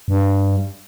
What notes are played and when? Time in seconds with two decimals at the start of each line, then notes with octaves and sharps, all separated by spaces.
0.08 G2